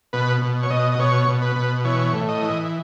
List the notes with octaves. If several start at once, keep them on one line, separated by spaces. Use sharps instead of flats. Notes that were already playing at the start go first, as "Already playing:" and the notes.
B2 B4
B2
C#5
B2 D#5
D#5
B2 C#5
B2
B4
B2
E3 C#5
A2
D#5
E3